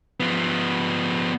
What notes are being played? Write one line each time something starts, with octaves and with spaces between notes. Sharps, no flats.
F3 B3